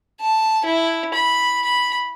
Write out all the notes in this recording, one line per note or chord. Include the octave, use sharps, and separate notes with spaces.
A5
E4
B5
B5